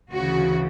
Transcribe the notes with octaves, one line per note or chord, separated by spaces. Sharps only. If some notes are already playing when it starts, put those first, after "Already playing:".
D2 C#3 E3 F#4